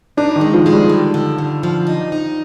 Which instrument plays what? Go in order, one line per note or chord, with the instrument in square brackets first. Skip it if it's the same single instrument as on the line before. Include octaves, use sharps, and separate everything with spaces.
[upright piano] D4 [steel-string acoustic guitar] D#4
[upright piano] D#3
[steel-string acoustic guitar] G#3
[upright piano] F3
[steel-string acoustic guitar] G#3
[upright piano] G3
[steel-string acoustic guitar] D3
D3
D3
F3
D#4
D#4